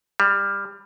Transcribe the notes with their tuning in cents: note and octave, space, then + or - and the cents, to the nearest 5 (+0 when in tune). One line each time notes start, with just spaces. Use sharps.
G3 +20